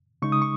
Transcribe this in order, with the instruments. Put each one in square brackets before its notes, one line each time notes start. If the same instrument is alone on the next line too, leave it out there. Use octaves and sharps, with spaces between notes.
[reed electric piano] C#3 G#3 D#4 C#6
D#6
C#6